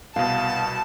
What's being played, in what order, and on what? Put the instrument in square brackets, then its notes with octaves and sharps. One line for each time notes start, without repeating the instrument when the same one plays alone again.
[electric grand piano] C2 B2 [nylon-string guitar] F5 [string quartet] A5